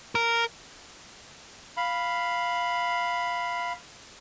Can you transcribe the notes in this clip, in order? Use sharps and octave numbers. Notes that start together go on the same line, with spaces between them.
A#4
F5 B5